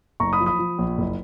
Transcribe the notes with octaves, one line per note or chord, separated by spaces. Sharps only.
F#1 A#5 C#6
B5 D#6
F3
B5 D#6
F3
A#1
F#1